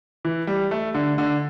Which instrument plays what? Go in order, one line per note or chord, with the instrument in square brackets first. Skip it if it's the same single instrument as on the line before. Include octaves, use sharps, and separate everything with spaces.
[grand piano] E3
G3
A3
D3
D3